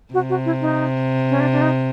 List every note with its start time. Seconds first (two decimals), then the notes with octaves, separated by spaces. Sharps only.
0.14 C3 F#4
0.30 F#4
0.45 E4
0.61 D#4
1.30 C#4
1.40 D4
1.52 D4
1.61 D#4